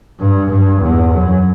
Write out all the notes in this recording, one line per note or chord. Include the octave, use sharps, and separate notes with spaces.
G2
G2
E2
F#2